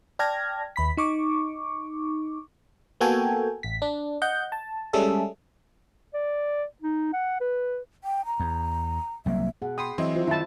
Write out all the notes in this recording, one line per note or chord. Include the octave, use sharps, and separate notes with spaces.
D5 G5 A5 F6 G#6 A#6
D#2 B5 B6
D#4 C#6 D6
A#3 B3 F#4 A4 G5 G#5
A1 B6
D4
D#5 F#5 G6
A5
G3 G#3 C#4 G#4 A4 E5
D5
D#4
F#5
B4
G5
A#5
E2
C2 F#3 A#3 E5
B2 G#4 F#5
G5 B5 C6 D#6
E3 F#3 C4 E4 D#5 C6
F4 C5
D#3 D#4 E4 A5